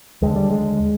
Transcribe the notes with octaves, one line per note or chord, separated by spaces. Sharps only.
D#2 D3 G#3
G3
G#3